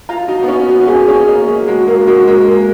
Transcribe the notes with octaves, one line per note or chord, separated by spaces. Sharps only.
F4 A#5
D#4 F#4
B3
C#4 F#5
B3 F#4
C#4
B3 G#4
C#4 G#4
A#3 D#5
F#3 G#4
G#3 F#4
A#3 A#4
G#3 F#4
G#3 A#4
A#3 A#4